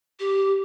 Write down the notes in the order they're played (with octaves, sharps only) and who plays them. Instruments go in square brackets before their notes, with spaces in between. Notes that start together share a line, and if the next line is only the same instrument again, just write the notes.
[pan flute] G4